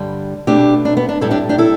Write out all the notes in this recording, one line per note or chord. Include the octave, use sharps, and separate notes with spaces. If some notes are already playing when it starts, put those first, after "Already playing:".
Already playing: G2 D3 G3
B2 A3 D4 G4
D4
B3
D4
A2 G3 E4 A4
D4 G4
D4 G4
E4 A4